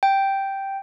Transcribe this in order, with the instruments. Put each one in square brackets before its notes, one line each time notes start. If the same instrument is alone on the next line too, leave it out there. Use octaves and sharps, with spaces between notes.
[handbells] G5